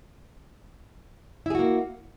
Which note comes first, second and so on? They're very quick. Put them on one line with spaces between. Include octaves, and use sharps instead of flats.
E4 G#4 F#4 A#3